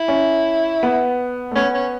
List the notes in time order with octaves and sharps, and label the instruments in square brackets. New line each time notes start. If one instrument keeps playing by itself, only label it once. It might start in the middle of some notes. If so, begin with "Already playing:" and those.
Already playing: [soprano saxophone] E4
[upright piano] C#4
B3
A3
[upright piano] B3 [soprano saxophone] C#4
[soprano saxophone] C#4